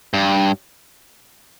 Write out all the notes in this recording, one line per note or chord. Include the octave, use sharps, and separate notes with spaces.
G2